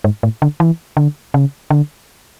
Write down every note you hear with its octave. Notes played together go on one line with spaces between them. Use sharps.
G#2
A2
D3
E3
D3
C#3
D3